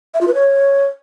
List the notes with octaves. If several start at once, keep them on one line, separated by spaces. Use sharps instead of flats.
E5
F4
B4
C#5